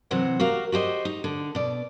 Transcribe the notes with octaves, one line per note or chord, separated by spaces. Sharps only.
C3 E3 F#3 C5 F#5
F#4 G4 A#4 F5
F#4 G4 C5 D#5
D#4
D3
B2 D5